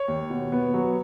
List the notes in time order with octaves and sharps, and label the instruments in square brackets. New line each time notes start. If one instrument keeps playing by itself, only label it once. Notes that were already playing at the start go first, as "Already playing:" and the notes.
Already playing: [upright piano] C#5
D#2
B2
B3
F#3